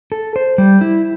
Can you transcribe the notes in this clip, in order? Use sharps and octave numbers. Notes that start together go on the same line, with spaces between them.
A4
C5
G3
E4